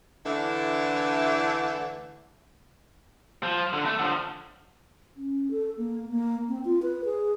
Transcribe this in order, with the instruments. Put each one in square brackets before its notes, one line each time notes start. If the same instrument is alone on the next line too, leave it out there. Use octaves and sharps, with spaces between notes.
[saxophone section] D3 E3 A3 D4 E4
[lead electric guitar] F3
D3
A3
D3 F3
[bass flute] C#4
A4
A#3
A#3
C4
F4
B4
G#4